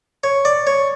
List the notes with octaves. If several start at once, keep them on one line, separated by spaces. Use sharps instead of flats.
C#5
D5
C#5